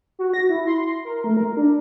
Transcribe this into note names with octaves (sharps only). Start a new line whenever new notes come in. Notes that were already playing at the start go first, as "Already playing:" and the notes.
F#4
A#6
E4
C6
A#4
A3
A#4
D4